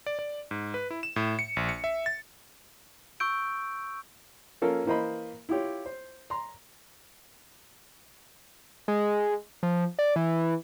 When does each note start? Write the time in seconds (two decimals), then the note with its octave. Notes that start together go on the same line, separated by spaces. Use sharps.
0.06 D5
0.19 D5
0.51 G#2
0.74 B4
0.91 E4
1.03 E7
1.16 A2
1.39 C#7
1.56 A#1
1.69 C#7
1.84 E5
2.06 A6
3.20 C#6 E6 G6 D7
4.62 F3 A#3 C#4 A4 A#4
4.86 E3 A#3 C5 D#5 B5
5.49 E4 F4 G4 C#5
5.86 C5
6.30 A#5 C6
8.88 G#3
9.63 F3
9.99 D5
10.16 E3